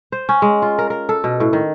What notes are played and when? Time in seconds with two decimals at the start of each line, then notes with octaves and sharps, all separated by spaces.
0.12 C5
0.29 C#4
0.42 G#3
0.62 F4
0.78 A#4
0.90 A#4
1.09 A4
1.24 B2
1.40 A2
1.53 D#3